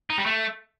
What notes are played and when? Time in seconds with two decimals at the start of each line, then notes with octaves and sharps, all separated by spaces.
0.10 D#4
0.18 G3
0.26 A3